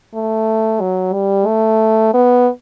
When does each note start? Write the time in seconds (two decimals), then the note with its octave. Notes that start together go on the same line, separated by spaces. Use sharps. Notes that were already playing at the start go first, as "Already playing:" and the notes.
0.14 A3
0.81 F#3
1.13 G3
1.47 A3
2.14 B3